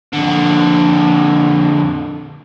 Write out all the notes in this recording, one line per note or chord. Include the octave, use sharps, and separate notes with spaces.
F2 D3